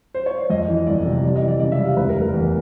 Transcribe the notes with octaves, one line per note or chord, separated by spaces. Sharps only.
C5
C#5
D5
F2 D#5
E3
G1 D5
C3
G3 D5
D#5
E3
D5
C#3 D5
E5
G3
F5
F1 B4
A#4
F1
A#4
E2